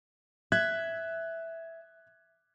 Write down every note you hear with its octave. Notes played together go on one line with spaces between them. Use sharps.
E5 F#6 G#6